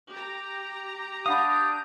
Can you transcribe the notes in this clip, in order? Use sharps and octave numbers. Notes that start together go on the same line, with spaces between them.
G4 A#5
D4 F5 F#5 B5 D#6 G6